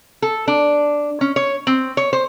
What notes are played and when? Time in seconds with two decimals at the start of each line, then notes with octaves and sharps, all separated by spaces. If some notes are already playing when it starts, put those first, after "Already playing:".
0.22 A4
0.48 D4
1.21 C#4
1.36 C#5
1.67 C4
1.97 C#5
2.13 C5